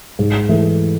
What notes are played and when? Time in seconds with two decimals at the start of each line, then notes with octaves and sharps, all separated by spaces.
0.19 G#2
0.49 E3 A3